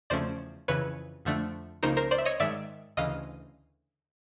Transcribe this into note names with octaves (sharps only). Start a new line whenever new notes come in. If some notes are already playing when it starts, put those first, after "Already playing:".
E2 C#3 F3 A3 C#4 C5 D5
F2 C#3 E3 B4 C#5
F2 D3 F3 A3 D4
C#2 C#3 F3 A#3 D#4 A#4 C5
A#4 C5
C5 D5
E5
C#5 D#5
G#2 D#3 G#3 D5 E5
D2 C#3 E3 D#5 F5